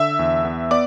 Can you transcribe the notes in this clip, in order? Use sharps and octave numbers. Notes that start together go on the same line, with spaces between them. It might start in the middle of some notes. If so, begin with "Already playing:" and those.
Already playing: D3 E5 E6
E2
B3
B3 D5 D6